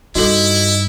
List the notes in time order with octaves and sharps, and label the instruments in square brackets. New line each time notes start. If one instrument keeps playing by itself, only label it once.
[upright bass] G2 [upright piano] D#4 F#7 [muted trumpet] E4 [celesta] F#4 A4